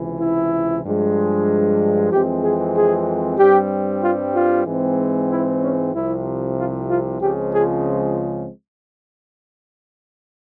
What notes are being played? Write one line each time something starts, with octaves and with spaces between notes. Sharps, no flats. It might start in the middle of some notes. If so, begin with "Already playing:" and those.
Already playing: C#2 C3 E3
E4
G2 F3 G#3
F2 E3 G#3 C4 G4
G#4
G#4
G2 G3 C4 G4
F4
F4
G#2 E3 G#3 C4
E4
C#4
C2 C3 F3 E4
F4
F4
C#2 C#3 F3 G#3 C4 G4
G#4